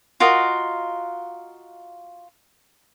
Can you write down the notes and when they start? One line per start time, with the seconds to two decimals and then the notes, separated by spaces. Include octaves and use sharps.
0.20 F4 F#4 A#4 D#5